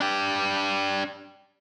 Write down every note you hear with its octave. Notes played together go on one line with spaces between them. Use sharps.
D4 G4